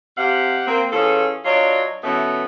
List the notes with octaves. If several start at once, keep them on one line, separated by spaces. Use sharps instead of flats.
C3 G4 F5 F#5
A#3 C4
E3 C#4 F4 G#4 A4
F#3 D4 F4 C#5 D#5
B2 E3 A3 B3 C#4